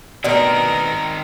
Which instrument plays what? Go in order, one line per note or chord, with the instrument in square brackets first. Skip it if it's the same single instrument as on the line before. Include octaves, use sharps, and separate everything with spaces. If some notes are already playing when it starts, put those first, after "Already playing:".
[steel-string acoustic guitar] D2 B2 [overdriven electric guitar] D#3 C4 [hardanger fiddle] A#4 [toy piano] D5